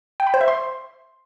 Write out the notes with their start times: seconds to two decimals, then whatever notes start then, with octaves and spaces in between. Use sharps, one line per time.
0.20 G5
0.27 B5
0.34 C5
0.41 E5
0.48 C6